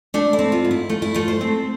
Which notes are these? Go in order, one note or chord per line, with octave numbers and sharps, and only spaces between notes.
A3 D4
E4
C4
F4
G#2
E4
A3 F4
E4
A3 F4
C5
C4